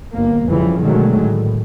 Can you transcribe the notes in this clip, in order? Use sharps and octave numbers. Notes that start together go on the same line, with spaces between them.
G1 A#3
F2 C#3 E3 F3 G3
B2 D3 D#3 F#3 G#3 A3
A2